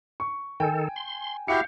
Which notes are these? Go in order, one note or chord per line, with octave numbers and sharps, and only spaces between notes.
C#6
D#3 A4 G5 G#5
C6
E4 F#4 G4 F5 G6 C#7